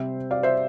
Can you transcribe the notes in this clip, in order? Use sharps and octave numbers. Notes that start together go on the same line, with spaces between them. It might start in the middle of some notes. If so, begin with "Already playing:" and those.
Already playing: C3 G3 C4 C5 E5
D5 F5
C5 E5